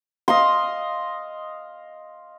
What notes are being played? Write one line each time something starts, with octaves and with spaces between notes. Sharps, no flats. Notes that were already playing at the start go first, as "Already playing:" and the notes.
D#5 F5 C6